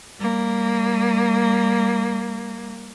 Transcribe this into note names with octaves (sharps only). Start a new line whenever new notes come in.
G3 A#3